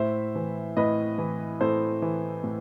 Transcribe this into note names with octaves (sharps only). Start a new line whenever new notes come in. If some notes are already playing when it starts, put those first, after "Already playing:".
Already playing: A2 C5 E5
E3
A2 B4 D#5
E3
A2 A4 C5
E3
A2